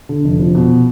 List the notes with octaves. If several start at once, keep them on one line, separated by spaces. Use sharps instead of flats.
D3
F1
F3
B2